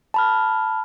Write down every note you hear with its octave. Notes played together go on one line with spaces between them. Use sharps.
A5 B5 F6